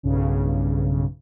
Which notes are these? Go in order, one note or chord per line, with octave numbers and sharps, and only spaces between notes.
B1 G2 C#3